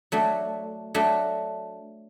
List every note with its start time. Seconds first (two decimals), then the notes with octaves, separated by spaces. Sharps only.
0.12 F#3 A3 D4
0.94 F#3 A3 D4